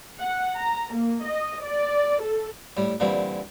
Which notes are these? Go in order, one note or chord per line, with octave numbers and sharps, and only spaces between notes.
F#5
A#5
A#3
D#5
D5
A4
A2 G3
A#2 D3 E3 G3 C4